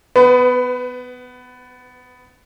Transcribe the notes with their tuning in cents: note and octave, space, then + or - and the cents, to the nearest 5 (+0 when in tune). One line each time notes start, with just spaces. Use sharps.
B3 +15 B4 +40